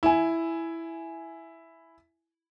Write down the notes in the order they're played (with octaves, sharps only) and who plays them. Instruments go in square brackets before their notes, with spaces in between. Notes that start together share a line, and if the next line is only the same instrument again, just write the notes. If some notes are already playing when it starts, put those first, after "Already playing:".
[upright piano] E4 G#5